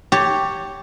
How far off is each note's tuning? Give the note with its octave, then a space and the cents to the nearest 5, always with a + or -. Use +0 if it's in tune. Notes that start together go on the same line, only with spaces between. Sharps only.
G4 +0 C#5 +0 A5 +25